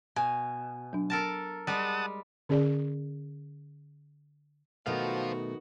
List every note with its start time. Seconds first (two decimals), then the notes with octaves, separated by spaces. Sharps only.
0.16 B2 G#5
0.93 F#3 D4
1.10 A4 A#4 A5
1.67 G3 G#3 F#5 A5 D#6
2.49 D3 C#4 G#4 D5
4.86 B2 D#3 F#3 A3 B3 F#4 C5 F5